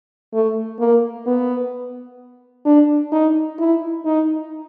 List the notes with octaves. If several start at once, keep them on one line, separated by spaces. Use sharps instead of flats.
A3
A#3
B3
D4
D#4
E4
D#4